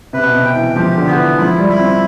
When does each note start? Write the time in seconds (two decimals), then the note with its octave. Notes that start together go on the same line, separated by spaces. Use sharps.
0.13 C3 B4
0.24 B2
0.34 C3
0.45 G5
0.55 E3
0.75 F3 G4
0.97 D3
1.07 B3
1.17 E3
1.38 F3 E4
1.59 G3
1.69 E4
1.79 C4